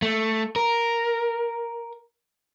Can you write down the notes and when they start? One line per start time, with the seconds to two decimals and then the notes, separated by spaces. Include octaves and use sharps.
0.02 A3
0.56 A#4